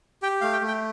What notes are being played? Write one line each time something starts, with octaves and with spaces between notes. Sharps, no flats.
G4 G5
A3 F5
G5
A3
G5